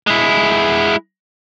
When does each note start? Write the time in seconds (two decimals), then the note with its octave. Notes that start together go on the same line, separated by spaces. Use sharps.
0.07 G#3 E4